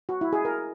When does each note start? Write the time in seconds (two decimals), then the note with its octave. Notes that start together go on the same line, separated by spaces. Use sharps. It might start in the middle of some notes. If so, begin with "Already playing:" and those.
0.09 F#4
0.21 E4
0.33 G#4
0.45 A#4